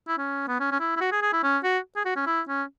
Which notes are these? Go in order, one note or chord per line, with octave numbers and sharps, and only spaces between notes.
E4
C#4
B3
C#4
C#4
E4
E4
F#4
G#4
G#4
E4
C#4
F#4
G#4
F#4
C#4
E4
C#4